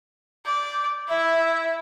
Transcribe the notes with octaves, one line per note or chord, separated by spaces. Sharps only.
D5 G6
E4 E5